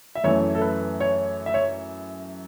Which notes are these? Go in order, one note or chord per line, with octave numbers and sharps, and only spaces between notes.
E5
F#2 E3 A3 C#5
A4
B4
C#5
E5
C#5